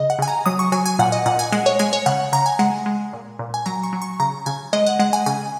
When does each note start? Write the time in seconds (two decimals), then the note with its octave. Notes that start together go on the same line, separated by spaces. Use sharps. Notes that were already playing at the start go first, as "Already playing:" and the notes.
Already playing: C#3 D#5
0.10 F#5
0.19 C#3 G#5
0.28 A#5
0.46 F#3 D#6
0.59 C#6
0.72 F#3 G#5
0.86 G#5
0.99 A#2 F#5
1.12 D#5
1.26 A#2 F#5
1.39 G#5
1.52 G#3 F#5
1.66 C#5
1.79 G#3 G#5
1.93 C#5
2.06 C#3 F#5
2.32 C#3 A#5
2.46 G#5
2.59 G#3 F#5
2.86 G#3
3.13 A#2
3.39 A#2
3.54 G#5
3.66 F#3 A#5
3.83 C#6
3.93 F#3
4.02 C#6
4.20 C#3 A#5
4.46 C#3 G#5
4.73 G#3 D#5
4.87 F#5
4.99 G#3 F#5
5.13 G#5
5.26 C#3 G#5